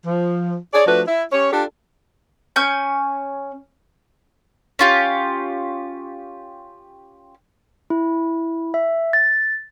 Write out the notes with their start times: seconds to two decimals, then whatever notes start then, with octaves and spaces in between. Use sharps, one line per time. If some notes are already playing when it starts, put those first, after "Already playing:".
0.06 F3
0.74 G#4 C#5 D5
0.87 F3 A3 D4 F#4 B4
1.07 E4
1.32 C#4 G4 C#5
1.52 D4 F4 G4 A4
2.56 C#4 G#5 G6
4.79 C#4 F4 G4
7.90 E4
8.74 E5
9.13 A6